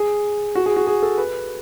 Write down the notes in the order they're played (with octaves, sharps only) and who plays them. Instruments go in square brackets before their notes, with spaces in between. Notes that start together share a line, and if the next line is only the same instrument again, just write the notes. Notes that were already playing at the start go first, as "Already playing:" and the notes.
Already playing: [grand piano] G#4
F#4
G#4
F#4
G#4
A4
B4